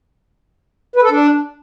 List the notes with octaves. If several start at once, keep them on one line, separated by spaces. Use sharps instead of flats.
B4
A4
D4